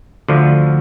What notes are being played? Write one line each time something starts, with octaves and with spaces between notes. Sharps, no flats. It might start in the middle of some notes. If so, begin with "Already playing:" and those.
D2 D3 F3